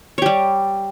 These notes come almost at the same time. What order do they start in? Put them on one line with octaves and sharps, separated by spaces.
C#5 G4 G3